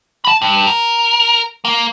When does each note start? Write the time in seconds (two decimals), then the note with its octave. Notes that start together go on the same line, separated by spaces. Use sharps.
0.25 A5 B5
0.42 G2
0.67 A#4
1.65 A#3